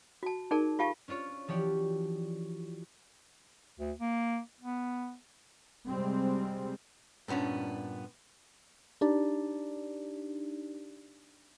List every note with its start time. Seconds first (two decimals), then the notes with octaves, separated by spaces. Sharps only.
0.23 F#4 A5
0.51 D#4 G#4 A#4 D5 A5
0.79 F4 G4 F5 A5 C#6
1.08 C#4 D4 F4 C#5
1.48 E3 F3 F#4 G4 C#5 D5
3.79 D2
3.99 A#3
4.60 B3
5.87 C3 G3 G#3 C4
7.28 G2 A#2 B3 C#4 D4
9.01 D4 D#4 G4 D5